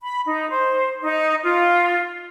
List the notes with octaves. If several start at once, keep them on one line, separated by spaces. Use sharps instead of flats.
B5
D#4
C5
D#4
F4